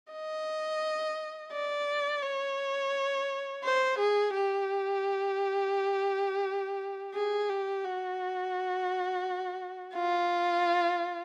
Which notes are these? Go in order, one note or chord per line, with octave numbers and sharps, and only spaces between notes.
D#5
D5
C#5
C5
G#4
G4
G#4
G4
F#4
F4